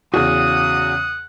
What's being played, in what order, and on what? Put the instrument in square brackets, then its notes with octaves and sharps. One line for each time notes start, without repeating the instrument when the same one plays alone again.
[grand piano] E2 C#3 [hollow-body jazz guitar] F#4 G#4 [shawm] F#5 [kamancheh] D#6